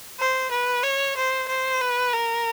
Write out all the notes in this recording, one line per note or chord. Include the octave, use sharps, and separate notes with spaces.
C5
B4
C#5
C5
C5
B4
A#4